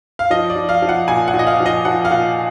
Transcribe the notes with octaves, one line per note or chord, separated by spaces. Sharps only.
F5
F3 D#5
D5
F3
F5
F3
F#5
A#2 G#5
F#5
A#2
D#5
F5
F3
D#5
F3 F#5
F5
A#2 F#5